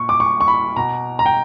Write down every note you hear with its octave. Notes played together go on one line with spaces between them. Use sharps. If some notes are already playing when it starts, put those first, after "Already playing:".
Already playing: A#2 C#6
D6
C#6
C#6
B5
B2 A#5
A#5
G5